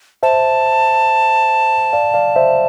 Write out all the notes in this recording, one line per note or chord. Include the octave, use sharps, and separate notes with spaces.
C5 E5 A5
D5 F5
D5 F5
C5 E5